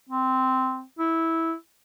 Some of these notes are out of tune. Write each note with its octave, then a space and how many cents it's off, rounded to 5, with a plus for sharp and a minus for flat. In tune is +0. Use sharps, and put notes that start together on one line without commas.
C4 -10
E4 -10